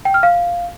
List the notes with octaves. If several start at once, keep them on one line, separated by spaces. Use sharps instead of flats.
G5
F6
F5